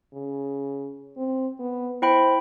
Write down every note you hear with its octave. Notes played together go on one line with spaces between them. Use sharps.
C#3
C4
B3
E4 C5 G5 B5